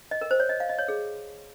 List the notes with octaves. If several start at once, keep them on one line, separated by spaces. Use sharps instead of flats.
D#5
A#4
C5
C#5
D#5
F5
D#5
C#5
G#4